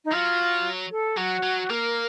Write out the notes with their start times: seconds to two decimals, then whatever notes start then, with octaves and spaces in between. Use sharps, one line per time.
0.04 D#4
0.12 F#3 F4
0.91 A4
1.17 F#3 F#4
1.43 F#3
1.70 A#3 A#4